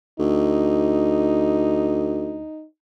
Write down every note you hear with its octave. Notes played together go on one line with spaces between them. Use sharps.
D2 D#4